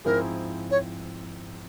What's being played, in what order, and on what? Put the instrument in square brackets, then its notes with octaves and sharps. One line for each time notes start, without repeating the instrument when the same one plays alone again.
[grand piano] G#2 F3 C4 E4 G#4 [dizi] A#4
[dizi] C#5